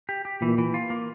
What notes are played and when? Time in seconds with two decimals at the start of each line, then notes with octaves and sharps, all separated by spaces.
0.09 G4
0.25 G4
0.41 A#2 E3
0.58 E3
0.74 F4
0.90 A#3